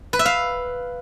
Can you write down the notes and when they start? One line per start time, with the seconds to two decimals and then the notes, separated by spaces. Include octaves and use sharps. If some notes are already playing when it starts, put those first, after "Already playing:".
0.13 B4
0.19 E5
0.25 F5